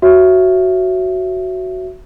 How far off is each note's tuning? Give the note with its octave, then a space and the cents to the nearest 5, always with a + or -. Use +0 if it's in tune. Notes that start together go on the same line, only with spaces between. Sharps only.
F#4 +5 C#5 +0 E5 +15